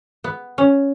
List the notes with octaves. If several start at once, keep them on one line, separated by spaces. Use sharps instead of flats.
B3
C#4